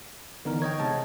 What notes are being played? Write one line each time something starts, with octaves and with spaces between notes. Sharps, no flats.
D3 E3 B3 D#4 A#4
C#5 D#5 G5 G#6
C3 G#3 A5